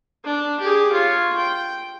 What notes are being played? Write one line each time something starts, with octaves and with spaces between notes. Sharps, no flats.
D4
G4 G#4
F4 C#5
G5